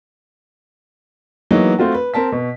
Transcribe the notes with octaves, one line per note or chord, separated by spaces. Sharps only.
E3 F#3 G#3 A#3 B3 D#4
A3 C4 F4 F#4
B4
C4 A#4 A5 B6
B2